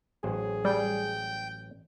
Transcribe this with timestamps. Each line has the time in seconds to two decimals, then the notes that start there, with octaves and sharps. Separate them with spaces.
0.24 A1 F#3 G#4 C5
0.65 G3 G5